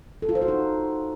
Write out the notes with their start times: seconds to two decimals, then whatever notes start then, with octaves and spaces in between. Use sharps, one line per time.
0.22 A4
0.29 F4
0.35 C5
0.42 F#4
0.48 D#4